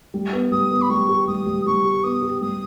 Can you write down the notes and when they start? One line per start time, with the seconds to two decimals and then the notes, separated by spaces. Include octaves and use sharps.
0.14 G3
0.33 B3
0.52 G3 D#6
0.71 B3
0.81 B5
0.90 G3 C#6
1.09 G4
1.27 G3 D#6
1.46 G3
1.66 G3 C#6
1.85 G4
2.03 B3 D#6
2.22 G4
2.41 G3 D#6